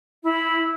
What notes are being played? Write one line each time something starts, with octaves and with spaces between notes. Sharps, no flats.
E4